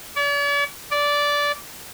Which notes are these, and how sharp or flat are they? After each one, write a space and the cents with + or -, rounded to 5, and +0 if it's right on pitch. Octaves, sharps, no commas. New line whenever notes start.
D5 -45
D5 -15